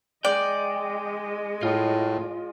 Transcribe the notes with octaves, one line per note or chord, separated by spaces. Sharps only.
G#3 D5 D#5 G5
A2 F4